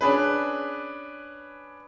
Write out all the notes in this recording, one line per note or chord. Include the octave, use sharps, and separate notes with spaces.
C#4 D4 G#4 B4